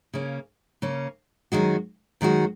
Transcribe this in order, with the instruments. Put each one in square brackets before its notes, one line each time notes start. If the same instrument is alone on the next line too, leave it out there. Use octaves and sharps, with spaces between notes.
[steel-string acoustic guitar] C#3 A#3 C#4
C#3 A#3 C#4
F#2 D#3 G#3 F#4
F#2 D#3 G#3 F#4